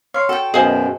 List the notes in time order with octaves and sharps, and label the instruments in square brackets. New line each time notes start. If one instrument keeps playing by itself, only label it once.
[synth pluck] C#5 C6 C#6 [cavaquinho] F5
[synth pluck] F#4 [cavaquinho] A4 G5
[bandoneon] F#2 B2 [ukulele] G#4 C5 [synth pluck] D#5 F5 G#5